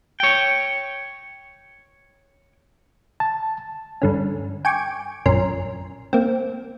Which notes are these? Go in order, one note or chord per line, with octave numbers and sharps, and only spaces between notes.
C#5 G5
A5
G2 D3 C#4
G5 G#5 C#6 D6
A#1 F#2 C#4 A#4 C6
A#3 C4